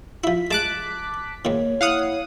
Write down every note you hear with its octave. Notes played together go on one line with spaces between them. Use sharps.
F3 E4 B6
G#3 A5 D6 F#6
G#2 D#3 A#3 C#5
E4 F5 F#5 D#6